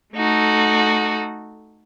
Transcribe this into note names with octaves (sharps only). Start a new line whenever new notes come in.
A3 D#4 F#4 A4